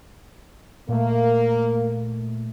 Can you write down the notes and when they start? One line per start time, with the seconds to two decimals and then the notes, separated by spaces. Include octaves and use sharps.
0.89 A#2 A3 A#3